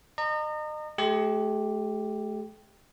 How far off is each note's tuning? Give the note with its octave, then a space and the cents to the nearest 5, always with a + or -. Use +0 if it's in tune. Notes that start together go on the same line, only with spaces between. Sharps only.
D#5 -35 A#5 -30
A3 -40 G4 +0